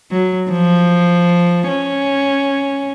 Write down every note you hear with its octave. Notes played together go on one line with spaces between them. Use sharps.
F#3
F3
C#4